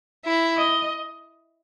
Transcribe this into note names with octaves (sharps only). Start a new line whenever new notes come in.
E4
D#5